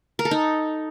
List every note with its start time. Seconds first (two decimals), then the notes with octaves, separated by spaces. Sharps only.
0.19 A#4
0.25 A4
0.31 D#4